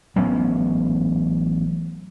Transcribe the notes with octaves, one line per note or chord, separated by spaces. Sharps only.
A1 F#3 B3 C#4